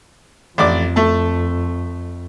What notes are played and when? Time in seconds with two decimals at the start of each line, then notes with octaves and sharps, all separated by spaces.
0.58 A1 F2 D5 D6
0.96 A3 A5